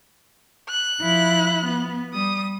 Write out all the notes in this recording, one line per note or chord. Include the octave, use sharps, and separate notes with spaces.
F#6
F3 E4
B3
G3 D#6